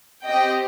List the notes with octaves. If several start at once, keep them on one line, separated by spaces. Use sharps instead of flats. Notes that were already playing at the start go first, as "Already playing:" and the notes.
C4 G4 D#5 G5